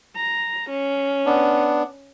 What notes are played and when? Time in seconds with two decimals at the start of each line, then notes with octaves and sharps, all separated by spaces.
0.16 A#5
0.70 C#4
1.26 B3 D4